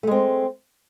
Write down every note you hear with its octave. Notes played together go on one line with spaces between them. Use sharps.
G#3 A3 C4